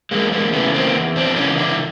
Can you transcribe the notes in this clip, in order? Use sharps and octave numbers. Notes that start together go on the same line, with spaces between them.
E2 G#3 A#3
G#3 A#3
C#3 E3 A3 B3
A#3 C4
E2
C4 D4
C#3 E3 C#4 D#4
D4 E4